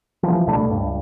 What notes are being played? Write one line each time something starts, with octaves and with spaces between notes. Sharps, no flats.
E3 F3
C2 B2 A3 D4
C#2 G2